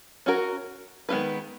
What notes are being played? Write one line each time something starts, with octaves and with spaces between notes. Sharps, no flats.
C#4 F#4 A#4
D#3 G#3 B3 F4 B4